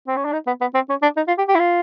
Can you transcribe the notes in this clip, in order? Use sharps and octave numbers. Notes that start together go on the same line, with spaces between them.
C4
C#4
D4
D#4
B3
B3
C4
C#4
D4
D#4
F4
G4
G4
E4
F4